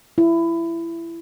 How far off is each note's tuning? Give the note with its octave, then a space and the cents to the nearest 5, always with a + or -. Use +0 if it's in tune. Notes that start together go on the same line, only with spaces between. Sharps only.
E4 +20